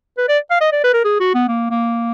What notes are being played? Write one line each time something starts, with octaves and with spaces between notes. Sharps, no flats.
B4
D5
F5
D#5
D5
B4
A#4
G#4
F#4
B3
A#3
A#3